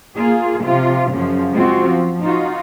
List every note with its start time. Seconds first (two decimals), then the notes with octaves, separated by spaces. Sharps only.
0.17 A#3 F4 G#4
0.62 C3 F3 F4
1.12 F#2 C#3 F3
1.54 G#3 C4 F4 F#4
1.87 F3
2.21 D#4 F4 F#4